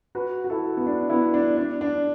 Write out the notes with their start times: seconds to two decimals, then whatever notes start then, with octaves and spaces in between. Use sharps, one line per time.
0.15 F#4 B4
0.44 F#4
0.50 E4 A4
0.77 B3
0.86 D4
1.10 B3 E4
1.34 D4
1.57 D4
1.81 D4